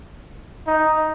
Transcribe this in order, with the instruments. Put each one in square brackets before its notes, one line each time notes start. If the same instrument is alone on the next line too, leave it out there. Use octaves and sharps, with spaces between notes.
[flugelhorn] D#4